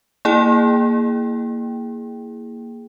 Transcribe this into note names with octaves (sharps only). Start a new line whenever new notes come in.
A#3 E4 G#4 G5